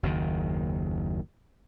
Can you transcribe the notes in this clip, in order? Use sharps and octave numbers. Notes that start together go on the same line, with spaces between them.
F#1 D#2 D#3